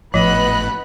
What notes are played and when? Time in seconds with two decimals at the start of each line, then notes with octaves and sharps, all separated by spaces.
0.14 G#1 A2 F3 B3 D#5 B5 F#6